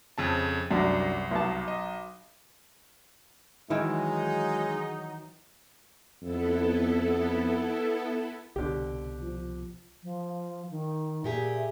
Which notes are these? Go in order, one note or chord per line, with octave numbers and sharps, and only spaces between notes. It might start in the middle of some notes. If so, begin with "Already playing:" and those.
F2 C#3 A5
C2 F#2 D4
B1 A5
D#5
D#3 E3 F#3 G#3 D#4
F2 B3 E4 A4
C2 B2 D3 G4
F3
F3
D#3
A#2 G4 G#4 E5